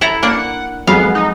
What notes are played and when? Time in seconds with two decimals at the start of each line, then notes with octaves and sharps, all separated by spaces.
0.01 E4 A4 A#5
0.23 A#3 D4 F#5
0.87 F2 F#3 G#3 B3 F5
1.15 D#4